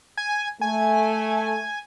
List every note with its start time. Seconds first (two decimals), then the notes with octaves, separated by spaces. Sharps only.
0.17 G#5
0.61 A3 G#5